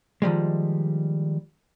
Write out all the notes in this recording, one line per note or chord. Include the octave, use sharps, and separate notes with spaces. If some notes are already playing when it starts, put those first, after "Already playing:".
D#3 F3 G3 G#3